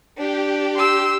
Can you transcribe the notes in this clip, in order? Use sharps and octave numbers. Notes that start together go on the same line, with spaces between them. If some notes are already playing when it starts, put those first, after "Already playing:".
D4 G4
C6 E6